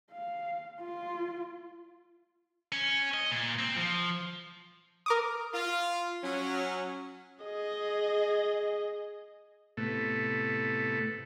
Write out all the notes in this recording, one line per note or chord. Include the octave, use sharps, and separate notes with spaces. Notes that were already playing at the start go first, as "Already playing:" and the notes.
F5
F4
C#4
D#5
A#2
C4
F3
A#4 D6 D#6
F4
F#3 C#4
G#4 D#5
A2 C3 A3 B3 A4